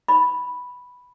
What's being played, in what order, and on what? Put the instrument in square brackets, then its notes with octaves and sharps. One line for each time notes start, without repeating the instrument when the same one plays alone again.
[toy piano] B5